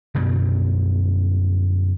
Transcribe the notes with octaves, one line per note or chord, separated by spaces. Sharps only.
F#2 B2 D3 G3